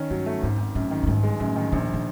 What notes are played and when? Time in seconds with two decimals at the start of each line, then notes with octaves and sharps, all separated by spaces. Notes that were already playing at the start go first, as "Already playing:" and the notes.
Already playing: D#3 C#4
0.11 G2 F#3
0.26 A3
0.42 G#1 G#2
0.58 G#1
0.75 F#2 A2
0.91 D#3
1.03 G2
1.07 G1 G#2
1.23 G#3
1.40 F#2 A2
1.56 D#3
1.72 A#1 A#2
1.94 A#2